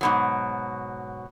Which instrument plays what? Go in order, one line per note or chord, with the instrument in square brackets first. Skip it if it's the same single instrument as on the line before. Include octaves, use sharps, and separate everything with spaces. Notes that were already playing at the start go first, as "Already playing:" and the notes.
[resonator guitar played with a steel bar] G#2 B2 F#3